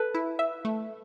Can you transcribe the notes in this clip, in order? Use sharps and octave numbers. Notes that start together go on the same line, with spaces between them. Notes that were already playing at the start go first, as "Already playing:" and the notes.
Already playing: A4 B4
E4
E5
A3